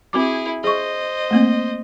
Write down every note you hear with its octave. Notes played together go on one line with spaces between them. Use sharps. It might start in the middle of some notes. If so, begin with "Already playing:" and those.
C4 E4 F#4 G#4 D6
G#4 C5 D#5 C#6
A3 A#3 C4